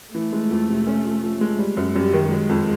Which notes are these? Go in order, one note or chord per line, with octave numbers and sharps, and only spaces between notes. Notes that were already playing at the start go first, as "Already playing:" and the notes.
E3 A3
G#3
F2
C3
C#4
F3
F3
G#3
G3
F#2
F#2 G3
D#3
F#3 G#3
F2